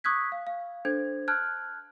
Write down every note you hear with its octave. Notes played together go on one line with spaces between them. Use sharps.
C#6 D#6 E6 F#6 G#6 B6
F5
F5
D4 A4 C5 G#6
A5 F6 F#6 G#6